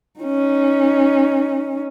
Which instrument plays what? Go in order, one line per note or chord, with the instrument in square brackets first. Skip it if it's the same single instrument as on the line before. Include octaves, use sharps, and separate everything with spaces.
[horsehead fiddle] C#4 D#4